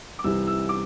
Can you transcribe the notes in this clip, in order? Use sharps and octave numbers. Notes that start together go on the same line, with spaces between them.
D6
C2 C3 E3 E6
E6
D6